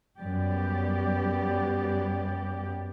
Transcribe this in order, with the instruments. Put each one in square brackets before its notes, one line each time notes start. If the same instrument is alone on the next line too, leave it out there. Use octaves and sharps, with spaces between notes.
[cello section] F#2 G3 B3 G4 D5